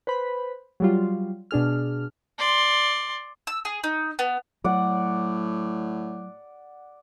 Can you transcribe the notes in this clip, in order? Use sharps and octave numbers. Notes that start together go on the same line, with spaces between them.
B4 C5 B5
F#3 G3 F4
B2 D4 G#4 F6
D5 C6
E6
G#4
D#4
B3
A2 F#3 D5 F#5